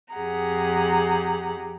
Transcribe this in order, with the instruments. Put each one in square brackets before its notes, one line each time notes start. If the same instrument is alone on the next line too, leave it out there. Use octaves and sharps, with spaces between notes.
[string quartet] F2 G4 G#4 F#5 A#5